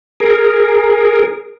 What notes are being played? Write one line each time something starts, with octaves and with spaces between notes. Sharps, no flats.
G#4 A#4